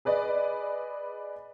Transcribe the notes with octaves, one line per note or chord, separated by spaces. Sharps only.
G#4 B4 D5 D#5